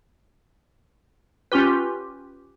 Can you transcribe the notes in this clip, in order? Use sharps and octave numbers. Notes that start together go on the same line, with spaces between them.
C#4 F4 G4 B4